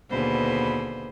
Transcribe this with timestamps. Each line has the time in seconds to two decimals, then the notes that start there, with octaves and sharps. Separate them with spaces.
0.11 D#2 B2 D3 G#4 B4 C5